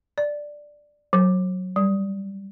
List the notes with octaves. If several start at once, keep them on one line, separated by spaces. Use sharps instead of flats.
D5
F#3
G3